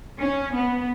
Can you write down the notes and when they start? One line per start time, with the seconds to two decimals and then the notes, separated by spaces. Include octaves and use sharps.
0.20 C#4
0.56 B3